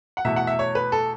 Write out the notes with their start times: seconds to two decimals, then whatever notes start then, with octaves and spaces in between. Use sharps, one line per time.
0.17 F#5
0.25 E2 B2 A3 E5
0.36 F#5
0.47 E5
0.59 C#5
0.75 B4
0.92 A4